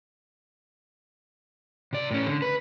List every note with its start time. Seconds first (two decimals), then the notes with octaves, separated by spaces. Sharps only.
1.93 C3 D5
2.11 A2 C#4
2.26 D3
2.42 B4